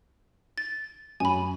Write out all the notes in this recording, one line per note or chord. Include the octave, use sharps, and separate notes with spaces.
A6
F#2 G#5 B5